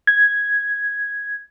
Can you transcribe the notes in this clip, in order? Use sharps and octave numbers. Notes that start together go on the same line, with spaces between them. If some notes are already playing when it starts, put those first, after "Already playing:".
G#6